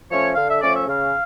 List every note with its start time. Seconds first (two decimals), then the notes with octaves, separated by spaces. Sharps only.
0.11 F3 A3 C#4 C#5
0.35 D3 F5
0.48 E5
0.61 F3 A3 C#4 D5
0.74 E5
0.86 C#3 F5